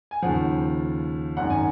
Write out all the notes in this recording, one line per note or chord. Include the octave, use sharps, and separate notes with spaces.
G#5
D#2 C#3 F3 F#5
G#1 F#2 D#3 F#5
G#5